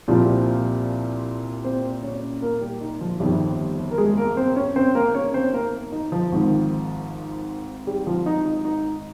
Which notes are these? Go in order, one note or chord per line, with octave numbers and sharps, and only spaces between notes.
C2 A#2 F3 G3 C4 F4
C4 C5
C#4 C#5
A#3 A#4
G3 G4
D#4
F3 F4
G1 F2 D#3 G3 G4
A#4
G#3 G#4
A#3 A#4
C4 C5
C#4 C#5
C4 C5
A#3 A#4
C#4 C#5
C4 C5
A#3 A#4
D#4
F3 F4
G#1 G#2 D#3
G3 G4
F3 F4
D#4
D#4
D#4